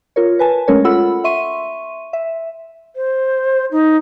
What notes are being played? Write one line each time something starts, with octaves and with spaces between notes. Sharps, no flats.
F4 A#4 C#5
B4 G#5 A5
G#3 A3 C#4 A#4 C#5
F4 A4 F#5 B5 E6
E5 C6 C#6 D#7
E5
C5
D#4